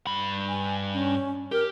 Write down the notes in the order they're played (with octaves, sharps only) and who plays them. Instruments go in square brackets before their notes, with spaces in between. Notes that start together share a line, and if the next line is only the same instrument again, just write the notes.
[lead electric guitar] G2 B5
[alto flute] G#5
C#4
[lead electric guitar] G4 [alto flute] A#4